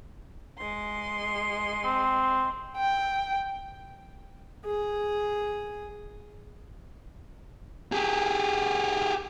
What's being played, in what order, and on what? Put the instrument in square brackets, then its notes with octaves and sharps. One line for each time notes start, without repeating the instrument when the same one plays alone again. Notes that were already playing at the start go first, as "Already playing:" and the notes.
[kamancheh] G#3 C6
[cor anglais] C4
[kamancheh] G5
[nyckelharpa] G#4
[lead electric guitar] G4 G#4